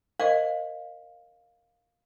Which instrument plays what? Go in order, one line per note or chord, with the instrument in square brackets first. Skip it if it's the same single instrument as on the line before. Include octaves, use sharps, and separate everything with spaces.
[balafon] A#4 C5 D#5 [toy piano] F5